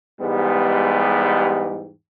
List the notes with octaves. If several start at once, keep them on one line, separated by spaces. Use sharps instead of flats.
E2 G#2 G3 G#3 B3 G4